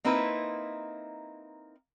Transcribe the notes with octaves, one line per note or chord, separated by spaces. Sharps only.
A#3 C4 D#4 E4 B4